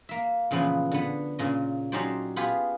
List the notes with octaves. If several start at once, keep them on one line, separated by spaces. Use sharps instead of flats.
A#3 E5
A#2 C#3 E3 F3 B3
D3 B3
A#2 C#3 D#5
F#3 C#4 D#4 G4 C5 D5
B3 F4 G4 G#4